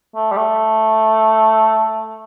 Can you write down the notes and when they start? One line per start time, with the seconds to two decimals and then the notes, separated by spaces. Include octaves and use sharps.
0.16 A3
0.32 G3
0.38 A3